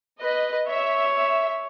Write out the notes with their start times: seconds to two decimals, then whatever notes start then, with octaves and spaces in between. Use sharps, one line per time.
0.20 B4 D#5
0.67 C#5 E5
1.14 E5